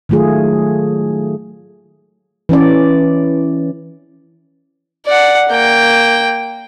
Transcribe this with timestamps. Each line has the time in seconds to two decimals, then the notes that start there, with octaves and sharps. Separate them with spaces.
0.09 D#3 F#3 A3 F4 G#4
2.49 E3 C#4 D5
5.06 D5 F#5
5.49 A#3 G5